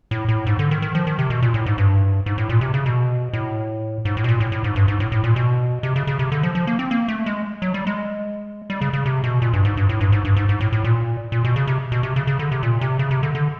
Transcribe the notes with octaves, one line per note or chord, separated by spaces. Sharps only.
A2
A2
G#2
D3
D#3
D#3
F3
D#3
C3
B2
A#2
A2
G#2
G2
G#2
A2
A#2
C3
C#3
B2
A2
G#2
A2
B2
A#2
A2
A2
G#2
G2
G#2
A2
A2
A#2
B2
C3
C#3
C#3
C3
D3
F3
F3
A#3
C4
A#3
A3
G#3
F#3
G3
G#3
G3
C#3
C#3
C3
B2
A#2
G2
G#2
G2
A2
G2
G#2
G2
G#2
G#2
A2
A2
A#2
A#2
B2
C#3
C3
B2
C3
C#3
C#3
D3
C3
A#2
C3
C#3
C3
D3
D3